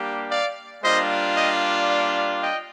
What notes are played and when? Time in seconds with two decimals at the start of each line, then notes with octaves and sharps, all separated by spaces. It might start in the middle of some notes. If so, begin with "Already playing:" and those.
Already playing: G3 A#3 D4 G4
0.30 D5 F5
0.83 G3 A#3 D4 F4 C5 D#5
1.35 D#5 G5
1.88 D5 F5
2.41 D#5 G5